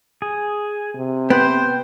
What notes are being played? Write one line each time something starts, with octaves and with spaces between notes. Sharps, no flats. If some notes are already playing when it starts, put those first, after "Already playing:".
G#4
C3
B3 C5 G5